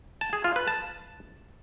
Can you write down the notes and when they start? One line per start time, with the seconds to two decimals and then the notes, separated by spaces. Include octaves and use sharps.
0.21 A5
0.33 G#4
0.44 F4
0.56 B4
0.68 A5